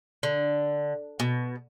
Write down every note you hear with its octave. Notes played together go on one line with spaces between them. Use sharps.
D3
B2